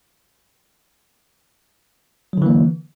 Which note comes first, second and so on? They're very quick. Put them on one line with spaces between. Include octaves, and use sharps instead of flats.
F#3 D3 E3 A#3